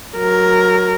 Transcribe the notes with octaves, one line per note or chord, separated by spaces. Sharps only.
F#3 A#4